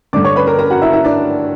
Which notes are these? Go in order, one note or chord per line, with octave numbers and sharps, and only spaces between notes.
G2 D3 D5 D6
C#5 C#6
B4 B5
A#4 A#5
A#4 A#5
F#4 F#5
E4 E5
E4 E5
D4 D5